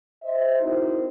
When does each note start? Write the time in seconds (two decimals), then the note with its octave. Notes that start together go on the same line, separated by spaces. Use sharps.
0.23 C5 D#5 E5
0.60 C4 D#4 E4 F#4 A#4 C5